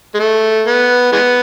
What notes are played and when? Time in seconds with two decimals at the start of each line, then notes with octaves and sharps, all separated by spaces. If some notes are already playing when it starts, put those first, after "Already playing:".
0.15 G#3
0.19 A3
0.66 B3
1.12 E3 G#3 B3